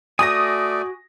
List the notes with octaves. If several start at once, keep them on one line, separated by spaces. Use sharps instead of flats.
A3 F#4 D5 G#5 D#6 A#6